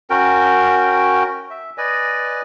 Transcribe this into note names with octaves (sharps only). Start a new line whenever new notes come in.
C#4 F#4 A#4 G5
E5
B4 D5 D#5 G#5